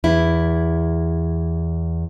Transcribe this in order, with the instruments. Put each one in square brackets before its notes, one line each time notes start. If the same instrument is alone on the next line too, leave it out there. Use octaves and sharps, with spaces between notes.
[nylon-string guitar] E2 E4